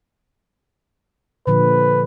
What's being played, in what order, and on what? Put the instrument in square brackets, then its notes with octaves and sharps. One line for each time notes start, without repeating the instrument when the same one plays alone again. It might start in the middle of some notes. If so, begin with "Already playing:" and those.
[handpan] A#2 D3 F3 [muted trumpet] B4